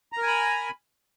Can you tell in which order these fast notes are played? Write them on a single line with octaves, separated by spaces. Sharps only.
A#5 A#4 G#5 B5